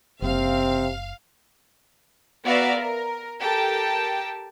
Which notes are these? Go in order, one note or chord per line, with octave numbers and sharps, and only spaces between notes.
F#1 C3 C4 F5
B3 F#4 D5 E5 F5 A#5
A#4
G4 A4 A#4 G5 A5